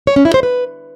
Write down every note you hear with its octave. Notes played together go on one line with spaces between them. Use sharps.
C#5
C#4
E4
C5
B4